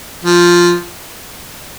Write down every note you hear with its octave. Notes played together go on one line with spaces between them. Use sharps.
F3